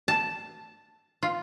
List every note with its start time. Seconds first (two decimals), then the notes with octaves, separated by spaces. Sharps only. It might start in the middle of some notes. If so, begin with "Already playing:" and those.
0.08 A5
1.23 F4